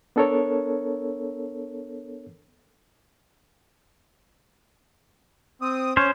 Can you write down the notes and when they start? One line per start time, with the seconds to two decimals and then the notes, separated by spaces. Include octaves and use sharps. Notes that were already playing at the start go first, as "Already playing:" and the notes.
0.16 B3 D4 A4 A#4 C#5
5.62 C4 D#6
5.97 C#4 C5 C#5